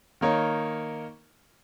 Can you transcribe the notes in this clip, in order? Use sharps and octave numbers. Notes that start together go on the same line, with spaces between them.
D#3 A#3 D#4 A#4 C#5